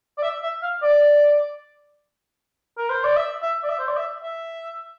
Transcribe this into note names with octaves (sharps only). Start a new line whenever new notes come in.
D5
E5
E5
F5
D5
A#4
C5
D5
E5
E5
D5
E5
C5
D5
E5
E5